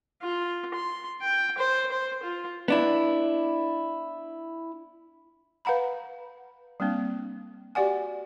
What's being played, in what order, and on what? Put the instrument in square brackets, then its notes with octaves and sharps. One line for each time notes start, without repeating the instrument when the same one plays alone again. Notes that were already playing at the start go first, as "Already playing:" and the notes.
[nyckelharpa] F4
C6
G5
C5
C5
F4
[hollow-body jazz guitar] B3 D4 E4
[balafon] B4 F5 F#5 A#5 B5
G3 A#3 C4 D4
F#4 G4 D5 F#5 G#5